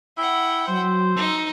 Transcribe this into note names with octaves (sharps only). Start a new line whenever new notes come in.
E4 F#5 G5
F#3 C5
D#4 E6